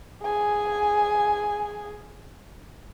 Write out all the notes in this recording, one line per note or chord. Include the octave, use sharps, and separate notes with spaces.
G#4 G#5